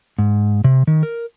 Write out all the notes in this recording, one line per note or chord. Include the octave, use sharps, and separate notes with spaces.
G#2
C3
D#3
A#4